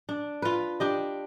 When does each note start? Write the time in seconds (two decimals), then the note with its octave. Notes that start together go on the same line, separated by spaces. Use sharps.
0.09 D4
0.42 F4 B4
0.80 D4 G4 D#5